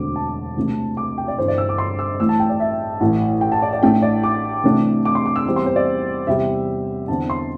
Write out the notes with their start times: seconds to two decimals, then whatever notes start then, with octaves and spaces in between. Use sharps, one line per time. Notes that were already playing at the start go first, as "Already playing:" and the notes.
Already playing: E1 D2 D3 C4 D6
0.16 A5
0.56 C2 C3 A3 D4
0.97 D6
1.18 G5
1.28 D5
1.38 G1 G2 E3 C5
1.48 D5
1.58 E6
1.69 D6
1.78 C6
1.99 E6
2.19 A1 A2 E3 A3 E6
2.29 A5
2.40 G5
2.50 D5
2.60 E5
3.00 A1 A2 E3
3.41 G5
3.52 A5
3.62 D5
3.73 D5
3.83 A1 A2 A3 D4 G5
4.02 D5
4.23 D6
4.64 C2 C3 E3 A3 D4
5.05 D6
5.15 C6
5.26 D6
5.36 E6
5.46 E2 E3 G3 C4
5.56 C6
5.66 C5
5.76 D5
6.27 E2 C3 G3 E5
7.08 E2 D3 C4 A5
7.30 C6